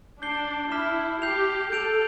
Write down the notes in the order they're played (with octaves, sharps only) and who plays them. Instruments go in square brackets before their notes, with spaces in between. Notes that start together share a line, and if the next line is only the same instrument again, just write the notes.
[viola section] D4 [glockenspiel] G6 C7 G7
[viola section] E4 [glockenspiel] A5 D6 F6 B6 E7
[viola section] G4 [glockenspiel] G6 C7 F7
[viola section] A4 [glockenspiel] G6 D7 F7